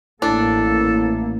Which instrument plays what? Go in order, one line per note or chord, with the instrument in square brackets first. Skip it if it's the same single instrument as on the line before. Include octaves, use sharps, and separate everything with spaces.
[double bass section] A1 A#3 [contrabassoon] A2 [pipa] D4 [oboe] A4